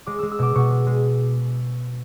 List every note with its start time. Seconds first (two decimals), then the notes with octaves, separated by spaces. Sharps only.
0.06 G#3 D6
0.19 G#3 E6
0.31 E6
0.39 B2 D6
0.55 B2 C#6
0.70 G#3
0.87 G#3